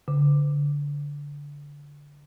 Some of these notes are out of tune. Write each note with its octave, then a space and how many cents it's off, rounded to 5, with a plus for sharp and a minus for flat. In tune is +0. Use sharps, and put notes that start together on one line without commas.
D3 -20